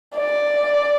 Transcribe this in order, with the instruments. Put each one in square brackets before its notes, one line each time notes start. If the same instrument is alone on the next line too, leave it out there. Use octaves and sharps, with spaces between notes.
[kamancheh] D5